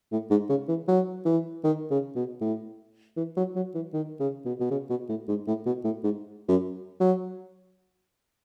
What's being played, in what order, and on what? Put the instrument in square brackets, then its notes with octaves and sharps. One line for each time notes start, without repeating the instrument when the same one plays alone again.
[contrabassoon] A2
G#2
C#3
E3
F#3
E3
D#3
C#3
B2
A2
E3
F#3
F#3
E3
D#3
C#3
B2
B2
C#3
B2
A2
G#2
A2
B2
A2
G#2
F#2
F#3